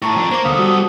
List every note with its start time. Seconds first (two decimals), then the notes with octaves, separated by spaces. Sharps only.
0.02 A2 A5 A#5 C#6
0.16 F2 D4
0.31 A#3 C5 D6
0.45 D2 B3 A4 F5 D#6
0.59 G3 F#4